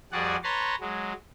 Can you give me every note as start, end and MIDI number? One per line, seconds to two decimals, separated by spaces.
0.12 0.36 41
0.12 0.36 55
0.12 0.36 66
0.12 0.36 68
0.12 0.36 74
0.12 0.36 78
0.44 0.75 71
0.44 0.75 73
0.44 0.75 81
0.44 0.75 82
0.44 0.75 84
0.80 1.13 54
0.80 1.13 56